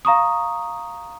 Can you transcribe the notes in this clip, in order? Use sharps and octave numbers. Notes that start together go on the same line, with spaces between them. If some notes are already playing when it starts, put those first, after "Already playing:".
F5 A#5 C#6 D#6